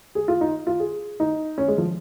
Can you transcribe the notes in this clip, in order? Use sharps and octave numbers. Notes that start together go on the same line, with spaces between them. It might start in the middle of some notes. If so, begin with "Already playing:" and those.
G#4
F4
D#4
F4
G#4
D#4
C#4
G#3
F3